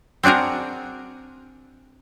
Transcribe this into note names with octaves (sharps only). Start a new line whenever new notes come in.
C4 D4 F#4 G#4 A#4